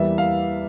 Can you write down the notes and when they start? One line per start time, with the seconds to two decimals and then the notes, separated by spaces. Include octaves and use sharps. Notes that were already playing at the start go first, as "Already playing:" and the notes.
Already playing: E2 E3 G3 A#3 E5
0.18 F5